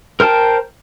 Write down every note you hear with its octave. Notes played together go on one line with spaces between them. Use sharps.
A#4 C5 G5 A5